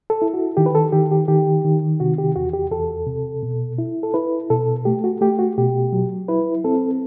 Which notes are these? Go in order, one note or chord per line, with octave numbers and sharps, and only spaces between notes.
A4
E4
F#4
D#3 G4
B4
A4
D#3 G4
G4
D#3 G4
D#3
C3 F#4
G4
E2 F#4
G4
E2 A4
C3
B2
E4
A4
E4 B4
B2 A4
A3 G4
F#4
A3 G4
F#4
B2 G4
F#3
E4 B4
C4 A4